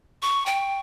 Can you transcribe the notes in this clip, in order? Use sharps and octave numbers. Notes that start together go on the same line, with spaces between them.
C#6
G5